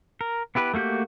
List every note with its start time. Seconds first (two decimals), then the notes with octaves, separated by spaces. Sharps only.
0.21 A#4
0.55 B3 E4 G4 B4
0.74 A3 A#3 F#4 G4 G6